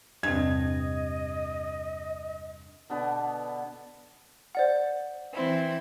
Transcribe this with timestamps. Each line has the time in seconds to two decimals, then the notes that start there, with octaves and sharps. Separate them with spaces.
0.23 E2 G2 C3 C4 D#5 G#6
2.90 B2 D3 B3 D4
4.55 C5 D5 F#5
5.34 E3 C4 E4